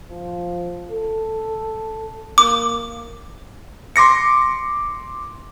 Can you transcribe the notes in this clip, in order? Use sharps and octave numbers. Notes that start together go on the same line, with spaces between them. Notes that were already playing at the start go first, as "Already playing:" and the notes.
F3
A4
A#3 D6
C6 D6 A#6 C#7